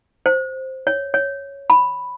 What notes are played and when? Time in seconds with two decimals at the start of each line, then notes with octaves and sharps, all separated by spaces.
0.26 C5
0.87 C#5
1.14 C#5
1.70 B5